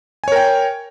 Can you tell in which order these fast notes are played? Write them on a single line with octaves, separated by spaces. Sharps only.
G#5 C#5 A#4 G5